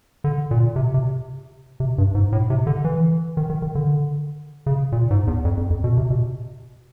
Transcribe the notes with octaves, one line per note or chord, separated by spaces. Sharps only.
D3
A#2
C3
C3
C3
G2
G#2
A2
C3
D3
E3
D#3
D#3
D#3
D3
C#3
A#2
G#2
E2
F2
F2
F2
B2
C3
B2